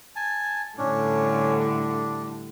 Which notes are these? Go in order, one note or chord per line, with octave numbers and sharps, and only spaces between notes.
G#5 A5
A2 D3 G3 C#4 D4
D4